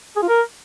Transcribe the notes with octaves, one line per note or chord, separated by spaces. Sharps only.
G#4
F4
A#4